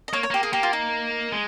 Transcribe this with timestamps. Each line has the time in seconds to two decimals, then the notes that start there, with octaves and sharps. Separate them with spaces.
0.08 D#5
0.13 A#3 C#5
0.23 C#5
0.31 A#3 G4
0.43 G#4
0.53 A#3 G4
0.63 F4
0.73 D#4
1.32 G#3